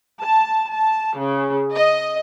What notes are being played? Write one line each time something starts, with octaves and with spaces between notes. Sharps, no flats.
A5
A5
C#3
D#5